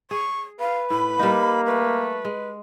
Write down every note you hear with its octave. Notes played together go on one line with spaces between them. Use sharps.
G#4 C#6
B4 F5
A2 B5
G3 A#3 D#4
A3 B4
G#3